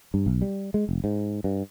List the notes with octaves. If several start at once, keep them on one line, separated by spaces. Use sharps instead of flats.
G2
B1
G3
G#3
F1
G#2
G2